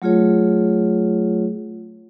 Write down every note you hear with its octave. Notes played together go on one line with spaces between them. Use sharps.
F#3 A3 F4 G#4 C#5